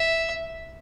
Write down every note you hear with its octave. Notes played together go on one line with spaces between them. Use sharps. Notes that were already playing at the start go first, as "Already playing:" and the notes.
Already playing: E5